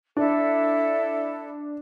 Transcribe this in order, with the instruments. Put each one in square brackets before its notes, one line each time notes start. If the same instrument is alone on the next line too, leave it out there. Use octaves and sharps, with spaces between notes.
[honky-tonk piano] D4 [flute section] E4 A4